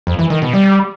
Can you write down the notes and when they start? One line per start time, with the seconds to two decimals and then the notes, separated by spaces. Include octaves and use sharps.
0.07 F2
0.19 E3
0.30 D#3
0.42 B2
0.54 G3